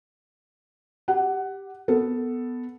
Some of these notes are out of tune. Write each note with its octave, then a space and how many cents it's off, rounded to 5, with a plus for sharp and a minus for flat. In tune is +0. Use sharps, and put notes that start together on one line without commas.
G4 +0 F#5 +15
B3 +5 A4 +0